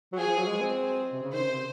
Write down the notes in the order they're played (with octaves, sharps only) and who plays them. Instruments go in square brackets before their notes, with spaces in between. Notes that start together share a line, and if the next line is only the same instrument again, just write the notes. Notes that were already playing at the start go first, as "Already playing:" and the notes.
[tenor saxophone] F#3
[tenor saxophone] F3 [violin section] G#4
[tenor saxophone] F3
F#3
G#3
C4
C3
C#3
[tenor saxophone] D#3 [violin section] C5
[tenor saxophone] C#3
C3